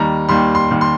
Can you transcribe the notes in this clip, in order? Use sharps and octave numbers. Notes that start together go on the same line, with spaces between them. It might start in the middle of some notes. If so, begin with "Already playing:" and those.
Already playing: D#2 D#3 G3 A#5
D#2 D#3 G3 C6
C6
D#2 D#3 G3
C6